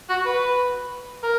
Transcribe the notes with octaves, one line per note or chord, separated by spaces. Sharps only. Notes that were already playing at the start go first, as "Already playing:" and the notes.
F#4
B4
A#4